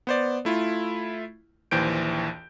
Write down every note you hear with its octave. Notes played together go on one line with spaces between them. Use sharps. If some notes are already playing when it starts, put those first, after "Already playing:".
B3 C5 D5
A3 E4 F4
A#1 D#2 E3 C5 G6 D7